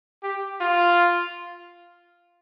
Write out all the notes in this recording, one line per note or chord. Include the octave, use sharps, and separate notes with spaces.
G4
F4